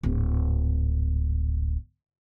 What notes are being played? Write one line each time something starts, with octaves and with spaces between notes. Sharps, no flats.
D1 G#1